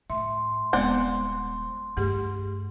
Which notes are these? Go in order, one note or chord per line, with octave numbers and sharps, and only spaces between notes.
A2 E5 C6
D#1 G#3 B3 C4 C5 D5 F#5
G2 A3 G4 G#4